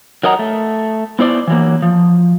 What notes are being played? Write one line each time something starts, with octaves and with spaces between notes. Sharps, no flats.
F#3 A#4 D#5 F#5 A#5
A3
B3 E4 C5 D5
E3 F#3 A#3
F3